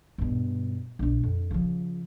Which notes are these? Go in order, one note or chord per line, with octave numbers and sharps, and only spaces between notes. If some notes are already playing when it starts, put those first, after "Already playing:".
G2 B2
A#1 D4
F2
C#3 F3